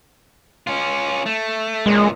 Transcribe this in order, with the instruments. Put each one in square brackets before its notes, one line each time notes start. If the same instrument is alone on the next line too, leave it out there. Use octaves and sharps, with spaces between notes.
[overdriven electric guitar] C#4 F4
A3
[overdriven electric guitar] C#2 A#2 [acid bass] G#3